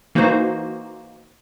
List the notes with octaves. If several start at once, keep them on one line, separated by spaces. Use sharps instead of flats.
E3 A#3 D#4 F#4 C5